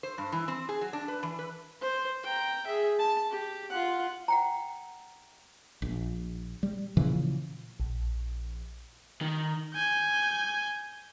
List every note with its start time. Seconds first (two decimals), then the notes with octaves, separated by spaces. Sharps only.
0.03 C5
0.18 G2
0.32 E3
0.48 C4
0.69 G#4
0.81 F#3
0.93 D4
1.08 B4
1.23 E3
1.39 B4
1.82 C5
2.24 G5 A#5
2.67 G#4 E5
2.99 A5
3.30 G4
3.70 F4 F#5
4.28 F#5 G5 A#5
5.82 A#1
6.63 G3
6.97 A#2 C#3 E3 F3
7.80 A#1
9.21 D#3
9.74 G#5 G6